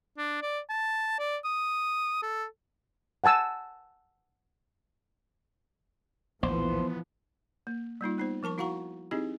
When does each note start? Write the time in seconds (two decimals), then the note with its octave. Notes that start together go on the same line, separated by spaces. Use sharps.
0.18 D4
0.42 D5
0.70 A5
1.19 D5
1.45 D#6
2.23 A4
3.24 F#5 G#5 A5 E6
6.43 A#1 D#2 A2 E3 F3 B3 C5
7.67 A#3
8.01 G3 A#3 D#4 F4
8.18 B3 D#4 C5
8.43 F3 A#4 A5 C#6
8.58 E4 F#4 F5 F#5 A#5 C#6
9.11 C4 D#4 E4 G4 G#4 D#5